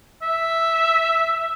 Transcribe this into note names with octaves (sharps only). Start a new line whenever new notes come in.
E5